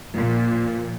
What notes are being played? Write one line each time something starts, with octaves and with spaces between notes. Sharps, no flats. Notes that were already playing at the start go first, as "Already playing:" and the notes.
A#2 F3